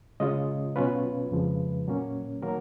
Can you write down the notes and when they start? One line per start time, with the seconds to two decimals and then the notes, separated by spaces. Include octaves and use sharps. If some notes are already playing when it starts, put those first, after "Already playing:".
0.20 C#3 G#3 C#4 F4 D#5
0.76 B2 F#3 C#4 F4 B4
1.31 F2 C#3 F3 G#3
1.87 A#2 F#3 A#3 C#4
2.42 D#3 F#3 A#3 A#4